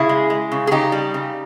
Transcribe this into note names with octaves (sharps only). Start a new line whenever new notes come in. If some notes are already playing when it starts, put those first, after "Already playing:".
Already playing: C#3 E4 G#4
G#3
G#3
C#3
G#4
C#3 D#4 G4
G3
C#3